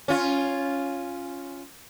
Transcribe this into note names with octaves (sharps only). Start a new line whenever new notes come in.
C#4 F4